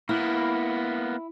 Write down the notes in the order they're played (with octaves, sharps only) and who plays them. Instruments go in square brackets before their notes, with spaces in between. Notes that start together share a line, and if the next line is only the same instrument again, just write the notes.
[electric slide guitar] A#3 B3 [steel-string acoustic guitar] E4